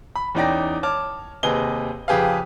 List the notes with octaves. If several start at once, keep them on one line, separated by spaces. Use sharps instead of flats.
B5
E2 C#4 D#4 D5 G5 A#6
C#5 A5 D6 F6
D#2 C3 G#4 B4 D#5 G7
F2 C#3 G4 G#4 B4 F5